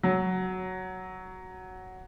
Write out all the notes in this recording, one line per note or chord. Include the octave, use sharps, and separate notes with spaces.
F#3